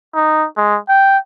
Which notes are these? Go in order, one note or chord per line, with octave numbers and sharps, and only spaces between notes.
D#4
G#3
G5